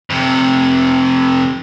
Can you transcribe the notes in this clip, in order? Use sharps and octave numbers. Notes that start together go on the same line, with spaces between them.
F2 C3